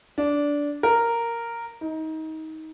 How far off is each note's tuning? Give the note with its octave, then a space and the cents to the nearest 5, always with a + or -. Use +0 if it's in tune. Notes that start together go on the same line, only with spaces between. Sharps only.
D4 -15
A#4 -5
D#4 +25